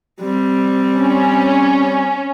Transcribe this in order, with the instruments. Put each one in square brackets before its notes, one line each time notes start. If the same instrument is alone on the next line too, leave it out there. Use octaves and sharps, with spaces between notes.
[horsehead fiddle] G3 C4
[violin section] C#4